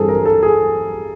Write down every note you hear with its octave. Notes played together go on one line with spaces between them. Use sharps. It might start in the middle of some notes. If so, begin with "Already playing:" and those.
Already playing: G2 E3 G3 C4 G#4 A4
A#4
A4
G#4